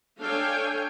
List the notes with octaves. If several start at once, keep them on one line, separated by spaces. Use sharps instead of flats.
D4 A4 C#5 F5 G5 G#5